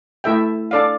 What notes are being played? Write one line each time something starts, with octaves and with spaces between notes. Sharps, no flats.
A3 E4 A4 E5 G5
D4 A4 D5 F5